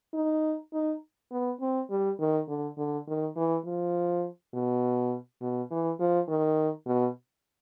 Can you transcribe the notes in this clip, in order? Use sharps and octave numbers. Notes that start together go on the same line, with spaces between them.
D#4
D#4
B3
C4
G3
D#3
D3
D3
D#3
E3
F3
B2
B2
E3
F3
D#3
B2